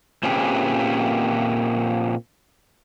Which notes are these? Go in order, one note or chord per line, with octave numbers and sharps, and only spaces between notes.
A#2 C4 C#4 G4 G#4 B4